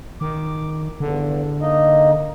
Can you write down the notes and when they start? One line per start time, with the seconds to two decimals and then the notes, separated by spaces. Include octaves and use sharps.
0.21 D#3 D6
1.00 E2 G2 D3
1.61 A#3 D#4 D#5